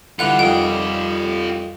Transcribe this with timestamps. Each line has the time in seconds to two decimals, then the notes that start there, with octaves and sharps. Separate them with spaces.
0.19 D3 E3 G3 F4 G4 F#5 F#6 F7
0.39 F2 D#3 C#4 G5